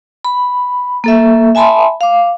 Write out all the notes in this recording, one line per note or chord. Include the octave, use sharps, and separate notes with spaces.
B5
A#3 A4 E5
E5 G#5 A5 B5 C6
F5 D6